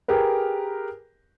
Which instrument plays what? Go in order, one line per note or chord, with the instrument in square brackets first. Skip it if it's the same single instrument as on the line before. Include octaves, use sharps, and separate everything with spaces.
[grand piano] G4 G#4 A#4 B4